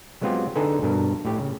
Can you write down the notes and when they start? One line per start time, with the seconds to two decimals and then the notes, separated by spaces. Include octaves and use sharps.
0.21 F#3 G#3 B3 C4 F4 G4
0.55 D3 D#4 G#4 A4 B4 G5
0.82 G2 B2 A#4
1.25 A2 G4
1.39 C#3